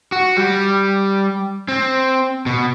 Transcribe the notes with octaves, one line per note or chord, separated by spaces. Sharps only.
F#4
G3
C4
B2